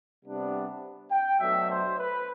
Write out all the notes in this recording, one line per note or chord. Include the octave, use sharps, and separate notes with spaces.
C3 G3 B3 D4
G5
B2 F#3 A3 D4 E5
C5
B4